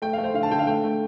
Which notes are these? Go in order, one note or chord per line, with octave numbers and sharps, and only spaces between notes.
A3 G5
F5
A3
C5
D3 F5
A5
D3 G5
F5
A3 G5
A3